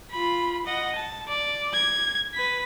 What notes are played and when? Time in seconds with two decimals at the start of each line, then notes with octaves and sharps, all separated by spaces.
0.11 F4 B5
0.66 D#5 F#5
0.96 A5
1.28 D5
1.74 G#6
2.34 B4 B6